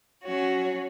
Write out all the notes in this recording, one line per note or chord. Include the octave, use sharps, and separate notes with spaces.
F#3 C#4 F#4 C#5